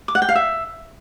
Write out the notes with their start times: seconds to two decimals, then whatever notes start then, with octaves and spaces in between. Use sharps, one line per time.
0.08 D6
0.15 F#5
0.22 G5
0.29 F5
0.35 E5